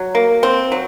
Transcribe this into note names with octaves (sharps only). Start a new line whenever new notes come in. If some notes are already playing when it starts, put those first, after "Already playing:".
Already playing: F#3
A#3
C4
F#3